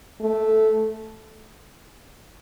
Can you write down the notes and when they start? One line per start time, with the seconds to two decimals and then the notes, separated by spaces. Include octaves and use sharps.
0.21 A3